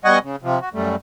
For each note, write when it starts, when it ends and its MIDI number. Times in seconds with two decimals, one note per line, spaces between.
0.05 0.19 47
0.05 0.19 55
0.05 0.19 75
0.05 0.19 78
0.05 0.19 80
0.05 0.19 85
0.22 0.36 49
0.43 0.59 48
0.43 0.59 53
0.62 0.69 66
0.74 0.96 42
0.74 0.96 55
0.74 0.96 57